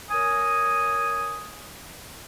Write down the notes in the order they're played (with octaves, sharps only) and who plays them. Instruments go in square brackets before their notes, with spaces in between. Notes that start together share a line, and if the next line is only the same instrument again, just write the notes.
[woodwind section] A#4 C#5 G#5 D#6